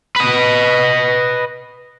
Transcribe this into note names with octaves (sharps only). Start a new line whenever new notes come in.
B4 D#5